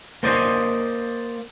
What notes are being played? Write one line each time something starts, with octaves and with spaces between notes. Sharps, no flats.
A#3 C5 D5 D#5